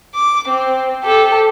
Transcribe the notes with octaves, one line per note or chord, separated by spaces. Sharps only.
D6
C4
G4 A4